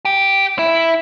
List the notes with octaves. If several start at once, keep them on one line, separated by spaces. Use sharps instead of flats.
G4
E4